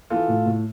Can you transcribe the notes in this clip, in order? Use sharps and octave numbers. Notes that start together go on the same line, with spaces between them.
E3 F4 A4
A2
A2